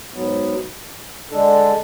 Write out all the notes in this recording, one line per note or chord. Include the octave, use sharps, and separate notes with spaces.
G#2 F#3 B3
D3 G#3 D4 A4